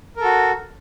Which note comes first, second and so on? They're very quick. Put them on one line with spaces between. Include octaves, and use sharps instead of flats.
A#4 A4 F#4